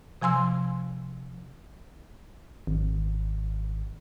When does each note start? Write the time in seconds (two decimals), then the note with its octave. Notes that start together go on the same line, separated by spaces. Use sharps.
0.21 C3 F3 G#5 C6 E6
2.67 G#1